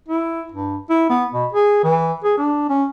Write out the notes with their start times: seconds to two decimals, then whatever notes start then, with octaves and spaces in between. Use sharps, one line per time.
0.09 E4
0.52 G2
0.90 E4
1.10 B3
1.34 B2
1.53 G#4
1.84 E3
2.24 G#4
2.38 D4
2.69 C#4